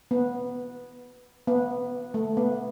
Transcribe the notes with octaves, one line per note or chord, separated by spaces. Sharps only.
B3
B3
A3
B3